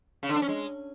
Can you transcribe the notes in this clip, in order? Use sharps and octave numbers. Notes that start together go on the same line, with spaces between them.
C#3
D3
D4
C#4
G#3